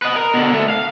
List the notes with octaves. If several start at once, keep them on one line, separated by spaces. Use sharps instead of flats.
B4 D#5
A#4
B2 D3
D3 A3
F5